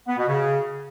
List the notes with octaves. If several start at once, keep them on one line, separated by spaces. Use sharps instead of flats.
B3
B2
C#3